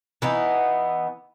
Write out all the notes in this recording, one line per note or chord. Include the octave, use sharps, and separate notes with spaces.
E3 B3 D#4